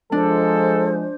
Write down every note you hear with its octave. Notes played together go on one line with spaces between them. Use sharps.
F3 G#3 D4 A4 C5